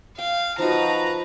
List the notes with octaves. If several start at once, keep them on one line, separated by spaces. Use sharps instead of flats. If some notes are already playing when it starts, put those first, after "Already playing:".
F5 G5
F3 D#4 F#4 B4 A5 A#5